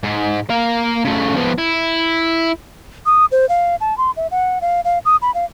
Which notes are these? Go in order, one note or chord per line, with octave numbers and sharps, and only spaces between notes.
G#2
A#3 F5
C#3 A3
F3 B3
E4
D#6
C5
F5
A5
C6
E5
F#5
F5
F5
D#6
B5
F5